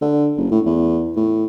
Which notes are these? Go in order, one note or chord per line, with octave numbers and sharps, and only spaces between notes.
D3
F#1
A2
E2
A2